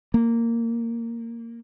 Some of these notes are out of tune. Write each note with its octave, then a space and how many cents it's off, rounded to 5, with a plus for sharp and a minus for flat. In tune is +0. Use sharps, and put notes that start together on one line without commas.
A#3 -10